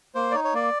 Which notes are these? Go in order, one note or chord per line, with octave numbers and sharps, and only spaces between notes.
A#3 C5
D5
D#4 C#5
C#5
A#3 D5